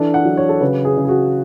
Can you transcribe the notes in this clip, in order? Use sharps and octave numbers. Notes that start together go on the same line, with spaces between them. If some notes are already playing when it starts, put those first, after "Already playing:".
Already playing: E3 D4 A4
F#5
F#3
C#5
A4
C#3 B4
G#4
C#3
G#4
F#4